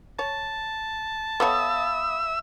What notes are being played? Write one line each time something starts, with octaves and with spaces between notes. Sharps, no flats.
C#5 A5
B3 A4 C#5 E5 F5 B5 D#6 E6